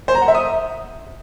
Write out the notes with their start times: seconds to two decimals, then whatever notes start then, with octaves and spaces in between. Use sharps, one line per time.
0.08 C5
0.15 A#5
0.21 F#5
0.28 E5
0.35 D#6